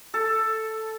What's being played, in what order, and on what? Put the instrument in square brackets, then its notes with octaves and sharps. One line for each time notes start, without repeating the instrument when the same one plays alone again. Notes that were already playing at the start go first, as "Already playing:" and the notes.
[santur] A4